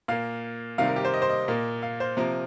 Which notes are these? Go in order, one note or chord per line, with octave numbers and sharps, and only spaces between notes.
A#2 A#3 F5
C3 D#3 G3 C4 F5
A#4
G4
C5
D#5
C5
D#5
A#2 A#3
F5
C5
C3 F3 A#3 A#4